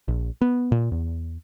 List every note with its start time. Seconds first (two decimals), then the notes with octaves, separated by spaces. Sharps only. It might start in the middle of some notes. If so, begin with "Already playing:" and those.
0.08 A#1
0.41 B3
0.72 A#2
0.91 E2